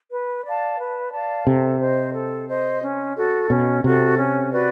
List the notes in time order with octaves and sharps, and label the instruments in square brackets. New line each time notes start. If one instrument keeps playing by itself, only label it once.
[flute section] B4
D5 F5 A5
B4
D5 F5 A5
[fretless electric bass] C3 [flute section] A4
[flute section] C5 D#5
A4
C5 D#5
C#4
F#4 A4
[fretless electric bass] B2 [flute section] C#4
[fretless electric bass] C3 [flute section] F#4 A4
[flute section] C#4
F#4 B4 D5